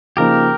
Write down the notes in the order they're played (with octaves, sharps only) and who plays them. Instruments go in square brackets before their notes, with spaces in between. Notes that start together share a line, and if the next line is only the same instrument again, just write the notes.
[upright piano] C#3 F3 A#3 D#4 [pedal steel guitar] G4 A#4